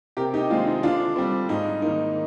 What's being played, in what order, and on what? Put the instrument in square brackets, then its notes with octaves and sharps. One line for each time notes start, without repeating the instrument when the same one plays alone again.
[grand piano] C3 G4 A#4
D#4 G4
D#3 G#3 C4 D4 F4
D#4
D3 D4 F4
G3 C4
G#2 D#4
D#3 A#3 D#4